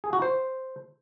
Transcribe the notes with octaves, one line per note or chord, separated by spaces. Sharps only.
G#4
F#4
C5